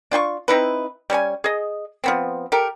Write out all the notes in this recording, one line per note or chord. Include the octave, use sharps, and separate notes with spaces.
D4 F4 G5 C#6
C4 D#4 E4 B4
G3 C#4 C#5 G#5
G#4 D#5
F3 B3 C4
G4 A4 A#4